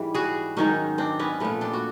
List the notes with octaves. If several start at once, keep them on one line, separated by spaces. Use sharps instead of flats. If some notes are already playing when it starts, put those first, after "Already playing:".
Already playing: G#2 E3 G3
F#4 G#4
G#2 D#3 F#3 C#4 D#4
C4 D4
B3 C#4
A#2 F3 A3 B3
C4 D4
F#4